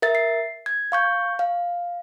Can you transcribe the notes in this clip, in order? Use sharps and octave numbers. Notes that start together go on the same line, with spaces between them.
A#4 E5 A6
C7
G#6
F5 C#6 G6
F5